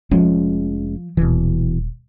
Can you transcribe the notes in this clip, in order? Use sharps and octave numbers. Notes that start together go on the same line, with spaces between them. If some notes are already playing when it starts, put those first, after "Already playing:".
F1 F3 G#3 C#4
D#1 B2 E3